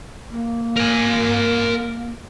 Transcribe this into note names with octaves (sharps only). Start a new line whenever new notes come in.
A#3
A#4 G#5